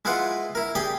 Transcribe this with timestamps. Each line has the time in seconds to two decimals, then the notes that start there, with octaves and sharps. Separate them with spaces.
0.05 G#3 E4 F4 B4 F#5
0.55 E4 A#4
0.75 G4 G#4 D5 G5